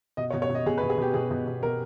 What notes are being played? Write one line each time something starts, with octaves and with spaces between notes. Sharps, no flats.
B2 D#5
C#5
B2
C#5
B2
D#5
B2 G#4
B4
B2
G#4
B2 G4
B2 G#4
B2
B2
B2 A#4